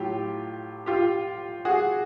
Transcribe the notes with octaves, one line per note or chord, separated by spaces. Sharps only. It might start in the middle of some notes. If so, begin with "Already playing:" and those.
Already playing: A2 F#3 F4 G4
F4 G4
F#4 G#4